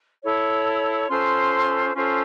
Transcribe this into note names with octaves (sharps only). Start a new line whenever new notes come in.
E4 A4 C#5
C#4 F4 A4 C5 C6
C#4 F4 A4 C5